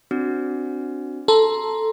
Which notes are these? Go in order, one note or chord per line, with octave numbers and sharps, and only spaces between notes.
C4 D4 F#4
A4 A#5 C6